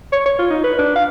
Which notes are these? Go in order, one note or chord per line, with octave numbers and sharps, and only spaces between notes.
C#5
C#5
F4
D#4
B4
D4
F5